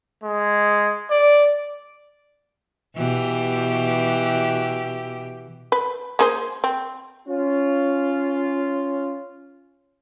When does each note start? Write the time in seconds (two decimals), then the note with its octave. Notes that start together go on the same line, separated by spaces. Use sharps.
0.23 G#3
1.11 D5
2.95 B2 E3 G4
5.72 B4
6.19 A#3 G#4 C5
6.64 C4
7.28 C#4 F4